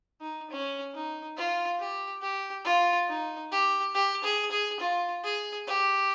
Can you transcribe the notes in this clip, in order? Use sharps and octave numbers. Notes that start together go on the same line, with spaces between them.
D#4
C#4
D#4
F4
G4
G4
F4
D#4
G4
G4
G#4
G#4
F4
G#4
G4